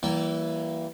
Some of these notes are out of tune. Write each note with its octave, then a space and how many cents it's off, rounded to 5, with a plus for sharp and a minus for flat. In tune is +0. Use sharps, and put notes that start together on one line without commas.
E3 +0 G3 -35 A#3 -5